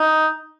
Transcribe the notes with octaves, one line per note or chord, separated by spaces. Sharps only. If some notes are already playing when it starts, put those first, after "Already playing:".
Already playing: D#4